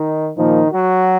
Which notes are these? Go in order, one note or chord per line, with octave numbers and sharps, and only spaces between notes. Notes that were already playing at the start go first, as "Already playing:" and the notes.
Already playing: D#3 D#4
A#2 D#3 F3 A#3 D#4
F#3 F#4